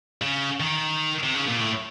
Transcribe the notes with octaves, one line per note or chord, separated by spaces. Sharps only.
C#3
D#3
C3
C#3
A#2
A2